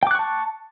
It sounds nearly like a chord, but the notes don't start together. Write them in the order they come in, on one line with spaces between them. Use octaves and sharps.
G5 D6 F#6 C#6 A5